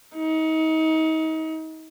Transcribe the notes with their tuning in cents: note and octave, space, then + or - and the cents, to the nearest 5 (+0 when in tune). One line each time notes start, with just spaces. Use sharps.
D#4 +35